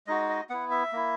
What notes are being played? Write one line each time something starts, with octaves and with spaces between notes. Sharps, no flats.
G#3 D#4 F#4 D#5
D#5
B3 E4 F#5
E5
A#3 E4